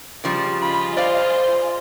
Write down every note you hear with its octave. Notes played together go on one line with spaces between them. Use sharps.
C#3 F3 G3
F4 G#4 D#5 B5
C5 D5 F5